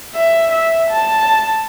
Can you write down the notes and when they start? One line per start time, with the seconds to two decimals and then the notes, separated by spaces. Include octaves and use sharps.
0.15 E5
0.52 E5
0.91 A5